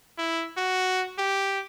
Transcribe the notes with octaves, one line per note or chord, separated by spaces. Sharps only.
E4
F#4
G4